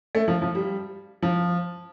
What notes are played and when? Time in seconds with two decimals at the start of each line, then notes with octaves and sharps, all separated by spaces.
0.15 A3
0.28 F3
0.42 F3
0.55 G3
1.22 F3